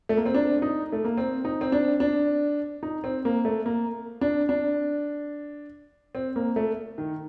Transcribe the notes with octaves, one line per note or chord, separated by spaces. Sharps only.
A3
A#3
C4
D4
D#4
A3
A#3
C4
D#4
C4
D4
D4
D#4
C4
A#3
A3
A#3
D4
D4
C4
A#3
A3
D#3